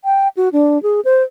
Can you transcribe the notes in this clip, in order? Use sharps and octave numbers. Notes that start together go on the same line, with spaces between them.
G5
F#4
D4
G#4
C5